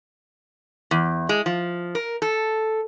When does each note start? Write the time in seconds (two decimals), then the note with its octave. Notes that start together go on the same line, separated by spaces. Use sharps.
0.91 E2
1.29 G#3
1.46 F3
1.95 A#4
2.22 A4